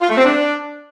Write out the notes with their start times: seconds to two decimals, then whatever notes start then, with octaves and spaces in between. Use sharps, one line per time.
0.02 F4
0.09 A3
0.17 C4
0.25 D4